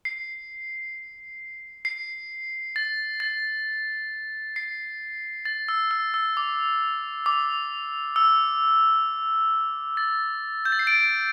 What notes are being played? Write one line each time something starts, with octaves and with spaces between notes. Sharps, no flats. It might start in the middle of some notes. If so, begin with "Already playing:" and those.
C7
C7
A6
A6
C7
A6
E6
E6
E6
D6
D6
E6
A6
G6
A6
C7
A6 D7